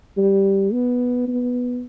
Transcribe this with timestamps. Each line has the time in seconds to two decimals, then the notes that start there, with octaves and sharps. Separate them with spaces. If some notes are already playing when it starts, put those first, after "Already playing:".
0.17 G3
0.73 B3
1.27 B3